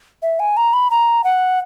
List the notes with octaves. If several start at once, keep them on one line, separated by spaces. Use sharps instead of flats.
E5
G#5
A#5
B5
A#5
F#5